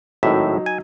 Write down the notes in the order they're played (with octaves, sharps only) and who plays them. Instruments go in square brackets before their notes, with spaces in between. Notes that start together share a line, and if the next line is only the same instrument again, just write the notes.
[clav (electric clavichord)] G#1 A2 E5 [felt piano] F#3 D#4
[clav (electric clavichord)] G#5